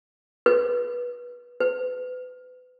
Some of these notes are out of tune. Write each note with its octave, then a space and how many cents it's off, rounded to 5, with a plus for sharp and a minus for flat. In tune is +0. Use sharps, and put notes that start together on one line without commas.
B4 -20
B4 +30